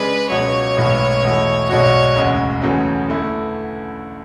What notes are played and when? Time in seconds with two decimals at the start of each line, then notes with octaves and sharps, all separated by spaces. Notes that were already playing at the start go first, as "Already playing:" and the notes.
Already playing: C#3 G#3 D4 G#4 B4 D5
0.30 C#2 B2 F#3 C#5
0.77 B1 A2 G#3 B3
1.23 E2 B2 A3 E4
1.69 B1 B2 G#3 D4 F#4 C#5
2.16 E1 D2 C#3 G#3
2.62 E2 C#3 F#3 A3 C#4
3.08 D3 A3 E4